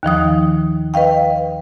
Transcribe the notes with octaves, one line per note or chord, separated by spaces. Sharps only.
D#2 D#3 F3 D#6
B4 D#5 F5 G5